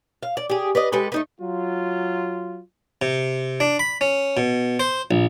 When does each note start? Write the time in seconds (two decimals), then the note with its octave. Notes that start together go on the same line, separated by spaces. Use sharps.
0.23 F5
0.37 D5
0.50 G4 G#4
0.75 B4 D5 D#5
0.92 G#3 G4 A4 B4
1.12 A3 D#4 B4
1.41 F#3 F4
3.02 C3
3.60 D4
3.79 B5
4.01 C#4
4.37 B2
4.80 C5
5.11 A#1